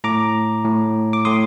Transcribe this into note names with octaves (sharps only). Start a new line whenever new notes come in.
A2 A#5 D6
A2
D6
A2 C6 D#6